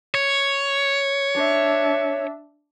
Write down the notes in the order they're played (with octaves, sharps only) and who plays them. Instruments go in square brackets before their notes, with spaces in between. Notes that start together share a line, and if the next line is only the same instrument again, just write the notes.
[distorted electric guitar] C#5
[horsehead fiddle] D4 E5